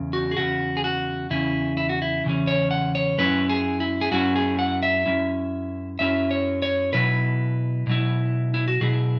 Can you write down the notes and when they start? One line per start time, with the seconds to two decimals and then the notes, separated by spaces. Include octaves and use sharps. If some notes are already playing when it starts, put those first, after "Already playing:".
Already playing: E2 C#3
0.13 F#4
0.31 G#4
0.37 E2 C#3 F#4
0.77 G#4
0.84 F#4
1.30 E2 C#3 C#4 E4
1.77 E4
1.89 F#4
2.02 E4
2.24 E2 C#3 E3 C#4
2.47 C#5
2.71 F#5
2.95 C#5
3.18 F#2 F#3 C#4 E4 B4
3.49 G#4
3.80 E4
4.01 G#4
4.12 F#2 F#3 C#4 E4 F#4
4.36 G#4
4.59 F#5
4.83 E5
5.06 F#2 F#3 C#4 E4
5.99 F#2 F#3 C#4 E4 E5
6.31 C#5
6.62 C#5
6.93 B2 F#3 E4 B4
7.87 B2 F#3 E4
8.54 E4
8.68 F#4
8.81 B2 F#3 E4 G#4